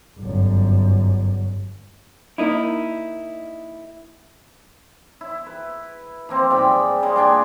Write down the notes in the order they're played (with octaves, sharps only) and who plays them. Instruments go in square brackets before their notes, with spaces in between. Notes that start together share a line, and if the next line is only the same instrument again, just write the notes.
[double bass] G1 F#2
[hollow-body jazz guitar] A#3 D#4 E4
[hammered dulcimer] E4
B4
F3 A#3 C4
G#2 G3 G5 B5
G3 G#3 A#3 F4
A#2 D4 G5 G#5